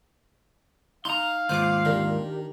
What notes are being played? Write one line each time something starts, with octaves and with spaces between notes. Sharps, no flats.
D#4 F5 A#5 C6
D#2 G#2 F4 C5 D6 F#6
D#3 D4 G4 A#4